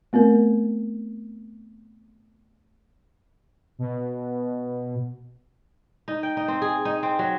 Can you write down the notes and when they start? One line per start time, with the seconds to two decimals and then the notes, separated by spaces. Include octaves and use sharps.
0.13 A3 B3 C4 A#4
3.79 B2
6.08 D#4
6.23 G5
6.37 D#4
6.48 C4
6.62 G#4
6.85 D#4
7.03 C4
7.19 F#3